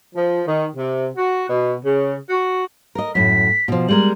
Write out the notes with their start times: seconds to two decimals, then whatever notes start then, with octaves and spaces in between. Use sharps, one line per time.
0.15 F3
0.46 D#3
0.74 C3
1.15 F#4
1.49 B2
1.83 C#3
2.30 F#4
2.95 A#4 D#5
3.15 F#2 A2 B6
3.68 B2 F3
3.88 G3 G#3 A#4 F#7